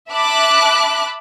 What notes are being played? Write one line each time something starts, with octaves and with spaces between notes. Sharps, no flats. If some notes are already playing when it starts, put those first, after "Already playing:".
E5 A5 B5 D6 F#6